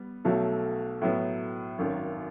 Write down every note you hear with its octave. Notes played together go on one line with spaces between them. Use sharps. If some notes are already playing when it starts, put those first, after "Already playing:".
Already playing: G3 B3
B1 B2 F#3 A3
A2 F#3 B3
G#1 F#2 D#3